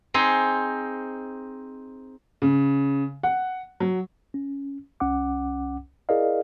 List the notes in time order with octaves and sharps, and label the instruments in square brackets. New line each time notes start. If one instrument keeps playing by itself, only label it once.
[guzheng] C4 D#4 G#4
[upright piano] C#3
F#5
F#3
[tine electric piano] C#4
C2 C#4 F#5 D6
E4 G#4 A#4 D5 D#5 F5